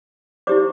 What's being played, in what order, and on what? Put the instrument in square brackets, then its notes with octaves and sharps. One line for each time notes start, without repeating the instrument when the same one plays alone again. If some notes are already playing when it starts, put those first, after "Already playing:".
[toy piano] E4 G4 C5 D5 D6